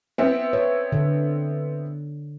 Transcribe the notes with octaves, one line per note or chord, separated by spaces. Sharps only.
B3 C4 E4
C#5
D3